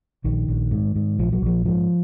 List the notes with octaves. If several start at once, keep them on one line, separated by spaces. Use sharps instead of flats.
A#1 D#3
A#1
G#2
G#2
A#1 F3
F#3
A#1 F3
G#2 F3